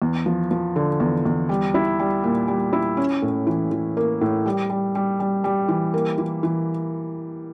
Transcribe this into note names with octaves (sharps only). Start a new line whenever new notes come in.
E2
F3
F3
D3
E2
E2
G3
E4
G3
A#2
G3
E4
C#4
A2
E3
E3
A#3
A2
G3
G3
G3
G3
G3
E3
A#3
E3
E3